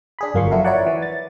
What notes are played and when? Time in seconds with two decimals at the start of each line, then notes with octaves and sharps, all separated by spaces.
0.19 D4 G#4 B5
0.34 G1 F#2 A#3 F4 C6 C#6
0.51 F3 E4 F#4 A4 A#4
0.65 E4 A#4 C#5 D5 F#5
0.86 E3
1.02 A6